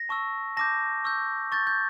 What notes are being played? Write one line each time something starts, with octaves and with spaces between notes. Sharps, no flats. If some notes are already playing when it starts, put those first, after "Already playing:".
Already playing: A#6
A5 C#6 E6
A5 D6 G6 A#6
C#6 E6 G6
C#6 G6 A6
G6